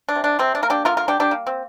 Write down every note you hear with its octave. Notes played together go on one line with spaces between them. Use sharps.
D4
C3
D4
C3 C4
D4
A#3 A#4
D4 G4
D3 F4 A#4
F4 A#4
G3 D4 G4
D4 G4
A#3
C4